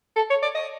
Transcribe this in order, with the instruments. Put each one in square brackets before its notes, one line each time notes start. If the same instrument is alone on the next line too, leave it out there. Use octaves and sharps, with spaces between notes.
[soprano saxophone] A4
C#5
D5
D#5